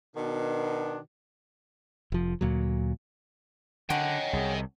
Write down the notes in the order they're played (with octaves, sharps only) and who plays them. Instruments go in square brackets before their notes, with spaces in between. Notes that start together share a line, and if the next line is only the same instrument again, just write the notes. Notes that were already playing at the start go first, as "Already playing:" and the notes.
[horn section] B2 D#3 D4
[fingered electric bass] F1 F3
D2 A#2 F#3
[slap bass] D3 [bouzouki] F#3 C#4 [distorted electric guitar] D#5 G5 [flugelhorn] F#5
[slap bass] C2 C3 [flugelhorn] G#4